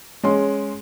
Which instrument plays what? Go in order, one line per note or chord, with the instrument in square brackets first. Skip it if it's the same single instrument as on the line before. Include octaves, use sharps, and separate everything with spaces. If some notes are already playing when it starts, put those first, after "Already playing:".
[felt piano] G#3 C#4 C6